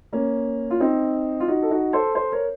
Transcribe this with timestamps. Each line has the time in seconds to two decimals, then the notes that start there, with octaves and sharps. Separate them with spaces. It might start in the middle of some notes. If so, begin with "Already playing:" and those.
0.13 A#3 C#4
0.70 F4
0.80 C4 D#4
1.40 F4
1.48 D#4 F#4
1.62 A4
1.71 D#4 F#4
1.93 A4 C5
2.15 A4 C5
2.32 A#4 C#5